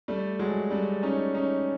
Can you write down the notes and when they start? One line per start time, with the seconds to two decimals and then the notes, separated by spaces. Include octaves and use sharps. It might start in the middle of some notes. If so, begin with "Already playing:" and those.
0.08 G3 A3
0.39 F#3 G#3
0.71 G3 A3
1.03 C#4 D#4
1.34 C#4 D#4